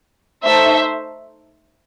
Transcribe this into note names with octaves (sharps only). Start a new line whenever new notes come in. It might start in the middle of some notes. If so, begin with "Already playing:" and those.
A3 D#4 A4 C5 E5